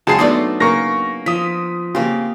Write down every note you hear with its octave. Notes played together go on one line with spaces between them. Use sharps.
C#2 F#3 G#3 G#4 A5 C6 C7
A3 B3 D4 D#4 D5 D#6 C7
C#3 A#3 A#4 C#6 A#6
F3 D#6 B6
C#3 A#3 C4 G4